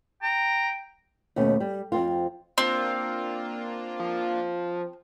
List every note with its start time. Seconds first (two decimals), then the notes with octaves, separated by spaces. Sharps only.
0.23 G5 A#5
1.36 D#2 B2 A3 C#4
1.60 G3
1.92 F2 C4 F4
2.58 A#3 C4 D4 F4
3.99 F3